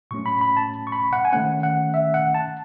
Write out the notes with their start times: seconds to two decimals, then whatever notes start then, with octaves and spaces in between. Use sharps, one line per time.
0.11 A2 F#3 A3 C#4 C#6
0.26 B5
0.41 B5
0.57 A5
0.87 C#6
0.92 B5
1.13 F#5
1.25 G#5
1.33 D#3 A3 C#4 F#5
1.63 F#5
1.94 E5
2.14 F#5
2.34 A5